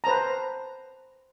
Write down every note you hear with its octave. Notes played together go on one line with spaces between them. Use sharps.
B4 C5 A5 A#5